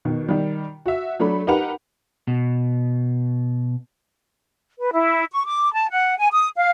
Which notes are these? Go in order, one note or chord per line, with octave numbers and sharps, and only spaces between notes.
B2 D#3
D#3 G3
F#4 E5
F#3 A3 D4 B5
D#4 G4 A#4 B4 F#5 F7
B2
B4
E4
C#6
D6
A5
F#5
G#5
D#6
F5